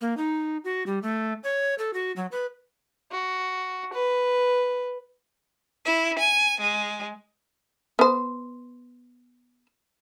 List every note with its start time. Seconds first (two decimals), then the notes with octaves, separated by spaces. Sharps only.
0.01 A#3
0.17 D#4
0.64 F#4
0.87 G3
1.02 A3
1.44 C#5
1.78 A4
1.94 F#4
2.16 F#3
2.32 B4
3.12 F#4
3.93 B4
5.85 E4
6.18 G#5
6.60 G#3
7.99 B3 C5